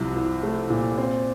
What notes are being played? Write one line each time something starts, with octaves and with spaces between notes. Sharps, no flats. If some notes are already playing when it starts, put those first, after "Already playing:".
Already playing: C2 C3 F3
C2
A3
A#2
C4